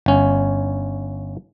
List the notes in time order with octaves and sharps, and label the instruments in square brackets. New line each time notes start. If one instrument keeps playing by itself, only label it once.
[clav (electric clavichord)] G1 C#4